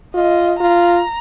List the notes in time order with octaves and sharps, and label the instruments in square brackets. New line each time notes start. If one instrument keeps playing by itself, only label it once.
[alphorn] F4 [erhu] D#5
[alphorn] F4 [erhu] A#5